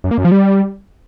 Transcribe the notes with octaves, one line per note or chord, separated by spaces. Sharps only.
F#2
A#3
F#2
F3
G3